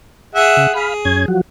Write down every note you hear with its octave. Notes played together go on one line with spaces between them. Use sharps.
G#4 E5 F#5
C#3
G#4 F5 B5
F#2 C#4 G#6
F3 F#3 F#4